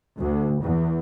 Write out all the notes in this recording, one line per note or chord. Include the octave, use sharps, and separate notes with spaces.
D2
E2